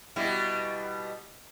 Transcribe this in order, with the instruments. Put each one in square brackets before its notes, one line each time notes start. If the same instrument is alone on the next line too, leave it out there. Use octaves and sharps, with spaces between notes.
[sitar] B2 G3 E4